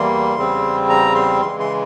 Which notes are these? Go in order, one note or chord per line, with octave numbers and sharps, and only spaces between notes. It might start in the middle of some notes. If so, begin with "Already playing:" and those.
Already playing: E2 E3 G3 A#3 C6
E2 C#3 G3 C4
A#5
C6
C#3 E3 G#3 C6
C6